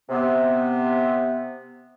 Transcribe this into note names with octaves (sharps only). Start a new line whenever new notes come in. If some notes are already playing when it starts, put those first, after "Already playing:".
C3 B3